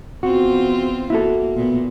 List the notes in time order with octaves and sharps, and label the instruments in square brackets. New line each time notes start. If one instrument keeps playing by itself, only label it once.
[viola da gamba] E2 C4 F4 [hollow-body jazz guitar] F#4
[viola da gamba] A#3 [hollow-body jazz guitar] E4 F#4 A4
[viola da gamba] A#2 B3